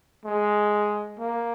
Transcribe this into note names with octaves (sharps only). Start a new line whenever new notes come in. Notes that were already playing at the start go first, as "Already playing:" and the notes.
G#3
A#3